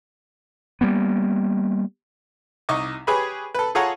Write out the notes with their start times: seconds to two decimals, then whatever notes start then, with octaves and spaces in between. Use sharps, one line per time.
0.81 G3 A#3 B3
2.69 C2 D#4 D#5 C#6 D6
3.07 G4 G#4 B4 C#5 G#5 B5
3.54 A4 B4
3.75 F4 G#4 A4 C#5 F#5 A#5